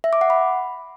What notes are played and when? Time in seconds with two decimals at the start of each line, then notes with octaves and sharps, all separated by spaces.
0.04 E5
0.13 D6
0.21 F#5
0.30 B5